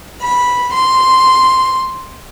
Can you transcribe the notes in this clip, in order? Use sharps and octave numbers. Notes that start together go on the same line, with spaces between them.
B5
C6